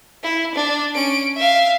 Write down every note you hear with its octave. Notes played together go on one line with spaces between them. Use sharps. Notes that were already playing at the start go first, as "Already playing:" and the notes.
E4
D4
C#4 D7
E5 F5